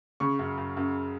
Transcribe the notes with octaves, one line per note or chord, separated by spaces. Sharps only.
C#3 C#6
F#2
F#2
F#2